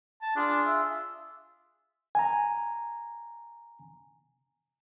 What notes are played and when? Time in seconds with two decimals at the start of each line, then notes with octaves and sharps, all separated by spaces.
0.22 A5
0.36 D4 F4 G#4
0.66 E5
2.15 G#5 A#5